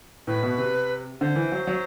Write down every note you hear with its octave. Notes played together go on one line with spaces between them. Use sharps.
A2 B4
B2
C3
D3 C5
E3
F#3
F#3